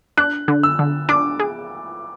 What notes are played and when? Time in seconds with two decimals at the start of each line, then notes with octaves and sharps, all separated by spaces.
0.17 D4 F#6
0.48 D3
0.63 E6
0.79 D3
1.09 D4 D6
1.39 G#4